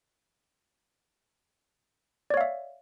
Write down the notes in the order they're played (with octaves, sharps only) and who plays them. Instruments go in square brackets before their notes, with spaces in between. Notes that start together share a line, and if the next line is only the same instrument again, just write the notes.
[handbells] D5
C#5
F5
E5